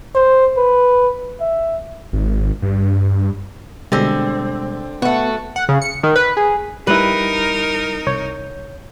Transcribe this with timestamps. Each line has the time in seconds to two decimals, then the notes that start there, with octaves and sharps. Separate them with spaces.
0.15 C5
0.57 B4
1.41 E5
2.13 G#1
2.62 G2
3.92 B2 D3 G3 G#3 C4
5.02 A3 B3 F#4
5.56 F#5
5.69 C#3
5.82 C#7
6.03 D#3
6.16 B4
6.37 G#4
6.87 G3 D#4 E4 A#4 B4
8.07 C2 C#5 G6